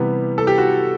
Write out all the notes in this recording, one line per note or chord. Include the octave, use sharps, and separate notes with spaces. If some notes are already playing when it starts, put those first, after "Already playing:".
Already playing: C3 E3 G3 B3
A4
G4
F#4